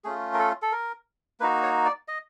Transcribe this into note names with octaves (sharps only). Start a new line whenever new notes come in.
A3 C#4 F4 G#4
A#4
A4
A4
A#4
A#3 D#4 F#4 B4
C#5
D5
D#5